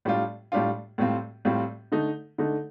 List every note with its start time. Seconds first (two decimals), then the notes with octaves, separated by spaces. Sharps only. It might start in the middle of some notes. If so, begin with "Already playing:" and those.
0.05 A2 G3 D4 F4
0.52 A2 G3 D4 F4
0.98 A2 G3 C4 F4
1.45 A2 G3 C4 F4
1.92 D3 A3 D#4
2.38 D3 A3 D#4